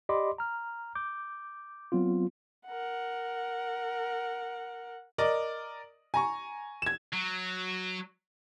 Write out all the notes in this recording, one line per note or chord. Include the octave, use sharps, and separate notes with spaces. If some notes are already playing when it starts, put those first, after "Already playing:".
G4 D5 D#5 B5 C6 D6
A#5 F6
D6 G6
F#3 B3 C4 F4
A#4 F#5
A#4 D5 D#5
G#5 A#5 C#6
G#6 E7
F#3